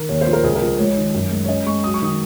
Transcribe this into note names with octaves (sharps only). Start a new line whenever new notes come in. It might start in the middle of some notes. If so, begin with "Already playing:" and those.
Already playing: D#3 A#4
D#2 C#5
C5
F3
A#4
C#2 G#4
A#4
F3
G#3 C#5
D#3
F#2
G#3
C#5
C#4 D#5
G#3 C#6
F#3 D#6
C#6
D#3 D#6